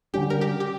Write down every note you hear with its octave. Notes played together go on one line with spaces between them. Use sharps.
D3 G3 C#4 G4
A#4
G4
G4